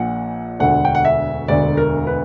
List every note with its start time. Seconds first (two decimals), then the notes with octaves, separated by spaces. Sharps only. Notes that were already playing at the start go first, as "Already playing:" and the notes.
Already playing: A#1 A#2 F#5
0.60 E1 D2 D3 F#5
0.85 G5
0.95 F#5
1.05 E5
1.48 E1 D2 D3 D5
1.77 A#4
2.07 B4